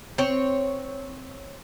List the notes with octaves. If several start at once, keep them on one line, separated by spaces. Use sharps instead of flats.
C4 C#5